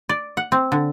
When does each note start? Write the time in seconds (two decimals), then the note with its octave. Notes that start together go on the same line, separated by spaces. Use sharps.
0.09 D5
0.37 F#5
0.52 C4
0.72 D3